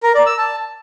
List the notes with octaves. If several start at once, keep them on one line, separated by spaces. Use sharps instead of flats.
A#4
D5
E6
A5